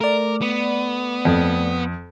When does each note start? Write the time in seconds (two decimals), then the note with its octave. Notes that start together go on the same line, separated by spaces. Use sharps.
0.01 A3 A#4 D5
0.42 B3
1.25 F2